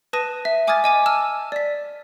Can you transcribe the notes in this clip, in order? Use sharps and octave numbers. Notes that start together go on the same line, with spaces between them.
B4 A5 D#6 A#6 D#7
E5
G#5 D6 D#6 F6 G#6 A6
D#5 G#5 D6
A5 E6 F6 E7
D5 B6